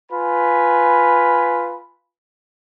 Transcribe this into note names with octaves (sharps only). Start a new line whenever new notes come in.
F4 B4 G#5 B5